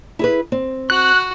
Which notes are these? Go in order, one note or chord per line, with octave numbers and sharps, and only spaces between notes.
E4 G#4 B4
C4
F#4 F#6